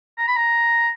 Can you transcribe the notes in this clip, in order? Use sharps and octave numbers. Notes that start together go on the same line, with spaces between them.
A#5
B5
A#5